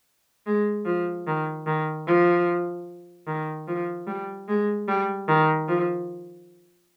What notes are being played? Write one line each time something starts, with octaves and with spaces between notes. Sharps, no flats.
G#3
F3
D#3
D#3
F3
D#3
F3
G3
G#3
G3
D#3
F3